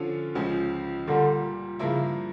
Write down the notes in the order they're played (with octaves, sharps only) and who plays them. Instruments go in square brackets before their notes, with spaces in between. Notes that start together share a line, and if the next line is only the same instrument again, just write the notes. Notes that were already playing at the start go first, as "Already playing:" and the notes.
Already playing: [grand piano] D3 F3 C#4 F4 A4
C#2 C#3 F3
[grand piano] A#2 G3 A#3 [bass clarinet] D3
[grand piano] G2 F3 A#3 E4 [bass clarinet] C#3